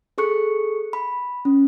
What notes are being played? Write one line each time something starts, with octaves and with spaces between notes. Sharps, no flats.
G#4 A4 C#6 F#6 C#7
B5
C#4